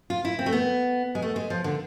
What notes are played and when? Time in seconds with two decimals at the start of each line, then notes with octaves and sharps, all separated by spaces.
0.10 F4
0.25 E4
0.39 C4
0.46 A3
0.53 B3
1.15 G#3
1.22 A3
1.36 G#3
1.50 F3
1.64 D3